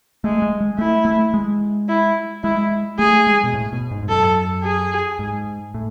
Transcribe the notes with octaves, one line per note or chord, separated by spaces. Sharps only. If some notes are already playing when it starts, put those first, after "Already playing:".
G#3 A3
G#3
G#3
A3 E4
A3
G#3
E4
G#3 E4
A3 G#4
G#3
B2
A2
B2
G#2
G#2
F#2 A4
G#4
G#2
A2